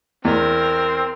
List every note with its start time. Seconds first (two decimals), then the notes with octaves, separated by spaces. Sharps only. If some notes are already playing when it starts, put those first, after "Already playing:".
0.25 E2 C4 A#4